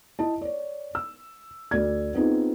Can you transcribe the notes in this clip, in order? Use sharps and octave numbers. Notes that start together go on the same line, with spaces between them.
E4 D#5 A5
C#5 D5
E6
D2 D5 G#6
B3 C4 D#4 F4 G#4